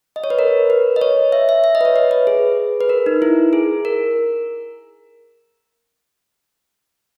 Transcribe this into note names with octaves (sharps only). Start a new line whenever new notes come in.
D#5
C#5
B4
A#4
B4
D#5
C#5
E5
E5
E5
D#5
B4
C#5
B4
B4
G#4
B4
A#4
D#4
E4
G#4
A#4